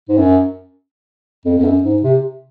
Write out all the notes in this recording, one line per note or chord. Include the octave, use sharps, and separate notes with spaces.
G#2
F#2
F2
F2
F#2
G#2
C3